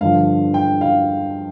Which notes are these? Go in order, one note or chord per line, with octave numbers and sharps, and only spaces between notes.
G2 D3 F3 F5
G5
F5